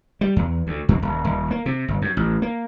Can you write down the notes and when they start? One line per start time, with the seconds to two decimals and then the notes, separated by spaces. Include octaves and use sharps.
0.21 G3
0.36 E2
0.67 D2
0.89 F2
1.02 D#1
1.25 D#1
1.51 A#3
1.66 C3
1.88 G1
2.02 F#2
2.17 A1
2.42 A#3